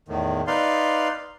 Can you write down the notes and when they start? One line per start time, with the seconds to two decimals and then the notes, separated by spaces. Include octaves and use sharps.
0.08 E2 A2 D#3
0.47 D#4 B4 D5 F5 C6